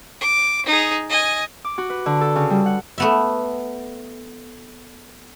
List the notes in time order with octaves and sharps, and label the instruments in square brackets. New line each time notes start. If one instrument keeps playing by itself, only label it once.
[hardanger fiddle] D6
D#4 G#4
D#5 G#5
[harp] D6
F#4
B4
D3
A4
C#3
G3
F#5
[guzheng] A3 B3 E5